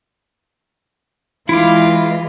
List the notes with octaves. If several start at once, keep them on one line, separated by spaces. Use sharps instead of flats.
E3 G#3 E4 F4 D6